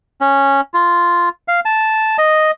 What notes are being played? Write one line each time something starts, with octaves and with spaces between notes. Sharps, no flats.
C#4
F4
F5
A5
D#5